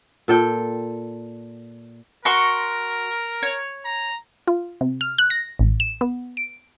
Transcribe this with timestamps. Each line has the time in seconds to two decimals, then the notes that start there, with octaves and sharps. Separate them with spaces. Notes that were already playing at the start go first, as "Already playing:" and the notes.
0.28 A#2 A4 G5
2.25 F#4 A#4 C6 C#6
3.43 C#5
3.85 A#5
4.47 F4
4.81 C3
5.01 F6
5.18 F#6
5.30 A#6
5.59 A1
5.80 E7
6.01 B3
6.37 D7